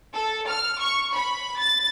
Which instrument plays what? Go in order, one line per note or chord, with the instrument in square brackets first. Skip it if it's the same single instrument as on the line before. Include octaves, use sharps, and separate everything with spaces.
[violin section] A4
F6
C#6
B5
A6